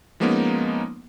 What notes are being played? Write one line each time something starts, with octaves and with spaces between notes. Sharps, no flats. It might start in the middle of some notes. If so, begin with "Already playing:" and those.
F3 G#3 A#3 B3 C#4 D#4